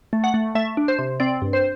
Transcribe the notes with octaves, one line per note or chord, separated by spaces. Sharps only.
A3
F#5
A3
A3 E5
D4
C5
C3
C4 D5
G2
C5